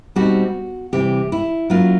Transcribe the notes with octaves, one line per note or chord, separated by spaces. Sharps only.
B2 G3 C4 D#4 F#4
C3 E3 G3 G4
E4
F#3 A#3 C#4 E4 F4